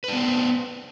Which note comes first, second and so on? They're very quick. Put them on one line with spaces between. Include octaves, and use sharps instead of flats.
B4 D4 B3 C5